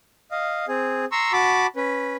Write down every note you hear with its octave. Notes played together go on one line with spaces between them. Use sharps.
D#5 F5
C4 G#4
A#5 C6 C#6 E6
F#4 A5 B5 D6
C#4 B4